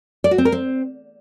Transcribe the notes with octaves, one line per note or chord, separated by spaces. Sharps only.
D5
F#4
C4
A#4
C4